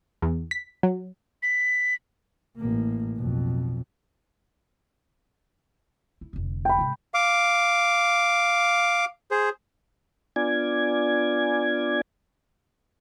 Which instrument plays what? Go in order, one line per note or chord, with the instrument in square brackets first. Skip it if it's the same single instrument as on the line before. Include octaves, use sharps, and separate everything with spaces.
[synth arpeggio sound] E2
B6
F#3
[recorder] B6
[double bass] A1 A#3
B1 F2
[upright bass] E4
F1 D3
[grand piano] G5 B5
[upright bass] G#2 C3
[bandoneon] F5 D6
G#4 C5
[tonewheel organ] B3 D4 F4 D5 G#5 G#6